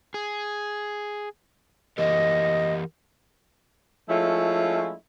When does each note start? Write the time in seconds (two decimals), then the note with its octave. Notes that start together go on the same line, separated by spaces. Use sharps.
0.14 G#4
1.98 E3 G4 A#4 D#5
4.09 F3 G#3 A3 C#4 E4 F4